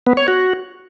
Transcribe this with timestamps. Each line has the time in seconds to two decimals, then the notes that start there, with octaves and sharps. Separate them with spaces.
0.07 B3
0.17 C#5
0.28 F#4